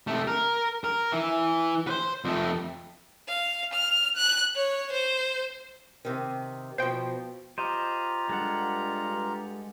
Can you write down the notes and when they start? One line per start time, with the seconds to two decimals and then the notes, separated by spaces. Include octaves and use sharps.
0.07 C3 A3
0.27 A#4
0.84 A#4
1.12 E3
1.87 B4 C5
2.25 F2 A3
3.28 F5
3.73 F6
4.16 F#6
4.56 C#5
4.92 C5
6.05 C3 D#3
6.78 B2 F3 C5 G5
7.58 F4 G4 C5 D#5 A#5
8.29 G2 G#3 A4 F#5